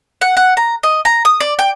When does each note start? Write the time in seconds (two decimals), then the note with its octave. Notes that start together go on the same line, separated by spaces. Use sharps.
0.21 F#5
0.37 F#5
0.57 A#5
0.83 D#5
1.05 A#5
1.25 D#6
1.40 D5
1.59 G5